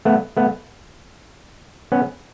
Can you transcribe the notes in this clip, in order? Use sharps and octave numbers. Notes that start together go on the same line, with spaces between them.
A3 B3
A3 B3
B3 C#4